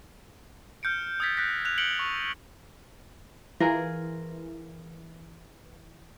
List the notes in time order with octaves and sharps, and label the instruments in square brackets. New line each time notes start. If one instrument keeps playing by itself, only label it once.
[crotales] F6 G6 C#7 D7
D#6 E6 G#6 A6 B6
F#6 G6 A#6 B6
F#6 F7
F#6 B6 C#7 D7 F#7 G7
C#6
[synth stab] E3 [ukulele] F4 G#4 A#4